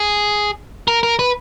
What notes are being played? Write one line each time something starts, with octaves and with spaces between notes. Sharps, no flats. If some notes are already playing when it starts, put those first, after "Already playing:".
Already playing: G#4
A#4
A#4
B4